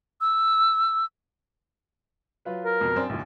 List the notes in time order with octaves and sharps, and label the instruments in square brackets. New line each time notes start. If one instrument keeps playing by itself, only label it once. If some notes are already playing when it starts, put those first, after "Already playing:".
[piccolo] E6
[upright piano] F#3 F4 B4
[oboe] A#4
[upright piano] F2 B2
F#2 C4 D4
A#1 D#2 A#2